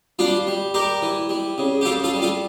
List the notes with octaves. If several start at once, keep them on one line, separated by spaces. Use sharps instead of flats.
G3 D4 F4
G3
G3 G4 A#4
E3
G3
C#3
G4
C#3 F4 A4
F4 A4
G3
F4 A4